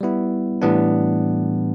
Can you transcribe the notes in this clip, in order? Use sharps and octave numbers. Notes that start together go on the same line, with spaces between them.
G3 B3 E4
A2 E3 G3 B3 D4